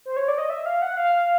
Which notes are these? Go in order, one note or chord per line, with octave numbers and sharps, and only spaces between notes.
C5
C#5
D5
D#5
E5
F5
F#5
F5